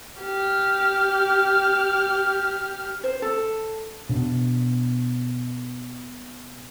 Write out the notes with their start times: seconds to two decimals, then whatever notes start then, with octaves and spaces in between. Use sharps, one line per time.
0.20 G4 F6
3.04 C5
3.22 A4
4.09 B2 D4